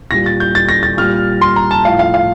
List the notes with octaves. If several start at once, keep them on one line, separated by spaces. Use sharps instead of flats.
A#2 G3 A#6
A6
G6
A6
A#6
A6
A#2 G3 F6
C6
A#5
A5
A2 F3 F5
F5
F5